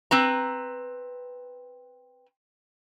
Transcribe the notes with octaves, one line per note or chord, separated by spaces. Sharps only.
C4 B4 A#5